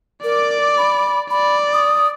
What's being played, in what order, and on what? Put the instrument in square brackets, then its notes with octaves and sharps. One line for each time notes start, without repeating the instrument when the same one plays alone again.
[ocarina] A#4 [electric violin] D5 D6
[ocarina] B5
[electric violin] D5 [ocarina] B5
[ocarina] D#6